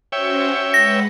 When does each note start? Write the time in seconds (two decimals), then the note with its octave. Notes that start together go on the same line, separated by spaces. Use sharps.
0.12 C#4 F#4 C5 C#5 E5 G5
0.74 G#3 B4 F#5 A#6